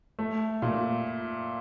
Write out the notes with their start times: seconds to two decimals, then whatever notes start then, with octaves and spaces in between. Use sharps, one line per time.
0.19 A3
0.62 A#2